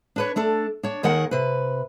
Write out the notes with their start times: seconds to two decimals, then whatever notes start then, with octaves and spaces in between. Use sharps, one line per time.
0.16 D4 B4 C#5
0.36 A3 D4 A4
0.83 D4 C#5
1.03 D#2 D#3 G#4 A#4 F#5
1.31 C3 B4